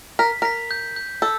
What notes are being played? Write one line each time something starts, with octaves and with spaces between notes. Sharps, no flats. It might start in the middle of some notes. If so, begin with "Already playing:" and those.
A#4 B6
A#4 B6
G6
G6
A4 E6